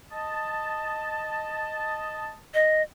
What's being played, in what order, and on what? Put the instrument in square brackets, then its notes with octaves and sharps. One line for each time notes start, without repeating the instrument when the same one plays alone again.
[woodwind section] D#5 A5
[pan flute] D#5